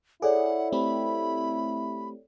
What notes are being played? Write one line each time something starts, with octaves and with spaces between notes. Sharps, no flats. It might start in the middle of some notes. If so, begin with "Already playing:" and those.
E4 G#4 A4 C#5 D5 F#5
A3 C4 G4 B5